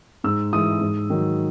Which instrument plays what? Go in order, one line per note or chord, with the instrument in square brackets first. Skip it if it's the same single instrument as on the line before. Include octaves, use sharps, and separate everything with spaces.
[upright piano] G#2 E6
E3 G#3 D#6
G#2
D#3 F#3